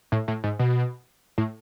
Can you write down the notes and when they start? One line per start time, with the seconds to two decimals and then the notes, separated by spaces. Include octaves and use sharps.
0.12 A2
0.28 A2
0.44 G#2
0.59 B2
1.38 A2